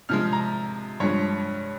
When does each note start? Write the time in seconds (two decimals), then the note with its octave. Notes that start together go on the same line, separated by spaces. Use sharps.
0.09 C3 F3 G#3 F6
0.33 A#5
1.00 G2 F3 G#3 C#5